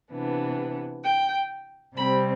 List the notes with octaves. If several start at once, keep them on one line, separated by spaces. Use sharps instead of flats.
C3 E3 B3 D4
G5
C3 G3 C4 B5